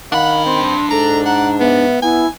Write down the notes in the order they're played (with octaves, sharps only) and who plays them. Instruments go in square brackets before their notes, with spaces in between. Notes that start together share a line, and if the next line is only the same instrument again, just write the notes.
[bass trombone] D#3 [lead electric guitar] D4 B5 [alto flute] F5 [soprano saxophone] F#5
[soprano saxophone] C4 [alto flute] C6
[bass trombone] G#2 [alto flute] A4 [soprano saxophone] A#5
[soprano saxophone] F#5 [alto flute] A#5
[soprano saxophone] B3 [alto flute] E5
[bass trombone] B3 [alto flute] E4 [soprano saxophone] G#5